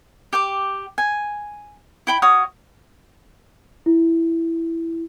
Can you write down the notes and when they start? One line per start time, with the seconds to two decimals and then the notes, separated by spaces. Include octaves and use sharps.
0.33 G4 G5 D6
0.98 G#5
2.07 E4 G5 B5
2.22 F#4 C#5 F5 D#6
3.86 E4